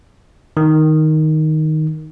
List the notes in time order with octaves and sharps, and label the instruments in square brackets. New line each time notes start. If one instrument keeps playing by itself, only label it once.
[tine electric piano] D#3